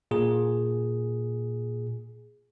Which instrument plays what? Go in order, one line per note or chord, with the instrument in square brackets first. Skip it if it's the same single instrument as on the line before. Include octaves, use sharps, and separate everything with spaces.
[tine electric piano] A#2 G#4